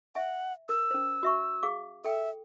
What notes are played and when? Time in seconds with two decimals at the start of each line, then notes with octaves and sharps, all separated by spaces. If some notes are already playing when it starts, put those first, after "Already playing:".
0.15 E5 F#5 G#5
0.69 A#4 E6
0.91 C#4 C5
1.23 F#4 E5 C#6
1.63 G#4 F5 D6
2.04 A4 E5 G5